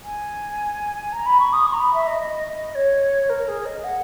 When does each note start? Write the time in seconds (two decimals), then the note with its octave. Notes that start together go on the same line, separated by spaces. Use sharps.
0.04 G#5
1.13 A#5
1.26 B5
1.40 C#6
1.53 D#6
1.67 C#6
1.73 A#5
1.81 B5
1.94 E5
2.07 D#5
2.21 D#5
2.48 D#5
2.75 C#5
3.29 A#4
3.48 G#4
3.66 D#5
3.84 F#5